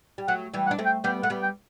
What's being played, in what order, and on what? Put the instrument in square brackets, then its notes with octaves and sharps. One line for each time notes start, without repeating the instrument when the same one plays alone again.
[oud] G3
[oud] F#3 A3 [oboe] F#5
[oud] E3 G3
[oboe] F#5
[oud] D4
A3 C4
[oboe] G5
[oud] G3 B3 [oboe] G5
[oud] A3 [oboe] F#5
[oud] G3 B3
[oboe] G5